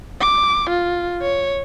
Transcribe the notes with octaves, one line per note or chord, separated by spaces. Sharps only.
D6
F4
C#5